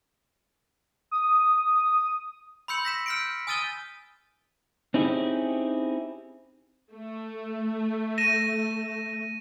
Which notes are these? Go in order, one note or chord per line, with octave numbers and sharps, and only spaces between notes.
D#6
B5 C6 E6 G6 C#7 F#7
A#6 B6 E7
F6 G6 B6 C#7 D7
G#5 D#6 F6 A6 D#7 G7
C4 C#4 D#4 E4 G4 G#4
A3
A#6 D#7 E7